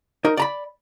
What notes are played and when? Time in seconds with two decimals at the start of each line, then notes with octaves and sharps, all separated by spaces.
0.25 D#4 A#4
0.37 D5 A#5 B5